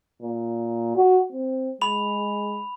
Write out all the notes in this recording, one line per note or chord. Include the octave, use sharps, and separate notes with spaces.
A#2
F#4
C4
G#3 B5 F7